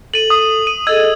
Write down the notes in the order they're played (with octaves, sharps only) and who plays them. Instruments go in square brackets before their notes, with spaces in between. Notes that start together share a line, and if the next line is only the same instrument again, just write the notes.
[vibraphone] A4 [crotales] D#7 F#7
[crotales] D#6
[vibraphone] D#6 [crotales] D#7
[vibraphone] G#4 A4 D#5 [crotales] E6 G#6